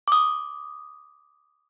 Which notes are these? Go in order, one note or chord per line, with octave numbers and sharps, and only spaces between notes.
D6 D#6